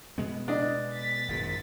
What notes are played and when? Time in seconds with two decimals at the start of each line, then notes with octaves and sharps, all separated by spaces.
0.18 B2 G#3 B3
0.48 D4 D#5
0.94 A6 B6
1.28 G#1 F#2 A#2